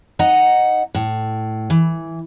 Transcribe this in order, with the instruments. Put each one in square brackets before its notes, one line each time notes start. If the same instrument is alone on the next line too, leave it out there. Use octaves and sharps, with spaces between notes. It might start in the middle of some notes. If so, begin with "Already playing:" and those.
[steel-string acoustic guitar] D#4 D#5 F#5 A#5
A2
E3